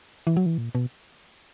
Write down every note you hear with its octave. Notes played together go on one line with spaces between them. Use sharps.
E3
F#3
E3
A#2
B2